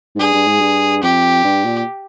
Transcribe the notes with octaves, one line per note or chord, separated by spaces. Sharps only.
G#2
G2 G#4
G2
G#2
G2
F2 G4
G2
A#2